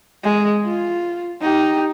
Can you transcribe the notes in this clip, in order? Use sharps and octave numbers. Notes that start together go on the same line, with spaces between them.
G#3
F4
D#4 G4